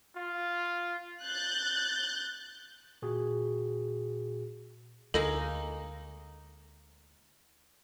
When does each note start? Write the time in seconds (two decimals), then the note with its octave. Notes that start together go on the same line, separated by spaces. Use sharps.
0.17 F4
1.23 F#6 G6 A6
3.02 A#2 F#4 G#4
5.14 D2 G#3 A#3 D#4 A4 A#4